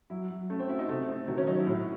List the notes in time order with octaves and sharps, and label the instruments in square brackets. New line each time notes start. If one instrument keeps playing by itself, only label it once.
[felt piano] F#3 [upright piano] E4
[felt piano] F#3
[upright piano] A3 [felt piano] C#4
[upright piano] C4
[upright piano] E4 [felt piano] F#4
[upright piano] D#4
[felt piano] C3 [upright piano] A3
[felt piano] C4
[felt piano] D#3 [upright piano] F#3
[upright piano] C#4
[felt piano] F#3 [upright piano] D#4
[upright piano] E4
[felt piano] A2 [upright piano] F#4